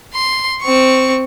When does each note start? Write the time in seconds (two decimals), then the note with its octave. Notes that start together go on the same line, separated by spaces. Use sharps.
0.14 C6
0.62 C4 C#6